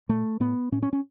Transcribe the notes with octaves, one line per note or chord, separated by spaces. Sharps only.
A#2 A3
A2 B3
A2 C#4
C#4
C#4